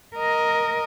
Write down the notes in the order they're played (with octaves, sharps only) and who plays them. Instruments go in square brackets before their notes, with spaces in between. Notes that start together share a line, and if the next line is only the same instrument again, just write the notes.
[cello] A#4 D#5